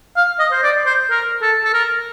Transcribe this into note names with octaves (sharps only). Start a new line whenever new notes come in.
F5
D#5
C5
D5
C5
A#4
A4
A4
A#4